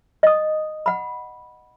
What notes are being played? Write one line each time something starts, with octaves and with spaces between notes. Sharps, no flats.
D#5 D#6
F#5 B5